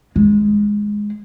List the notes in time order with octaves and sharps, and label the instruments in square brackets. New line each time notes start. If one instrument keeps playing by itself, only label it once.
[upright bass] G#3